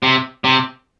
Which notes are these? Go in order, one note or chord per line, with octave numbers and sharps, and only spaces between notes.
C3
C3